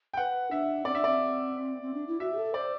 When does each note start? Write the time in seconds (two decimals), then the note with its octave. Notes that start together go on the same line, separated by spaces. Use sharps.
0.13 G5
0.17 B4 F#5
0.51 D4 E5
0.85 C4 D5
0.95 D4 E5
1.04 C4 D5
1.82 C4
1.94 D4
2.08 E4
2.20 F#4 E5
2.32 G4
2.37 A4
2.54 C5 D5